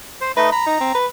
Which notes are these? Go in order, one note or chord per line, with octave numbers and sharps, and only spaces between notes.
C5
A3 D#4 B4 D#5
A#5 B5
D#4
C4
B4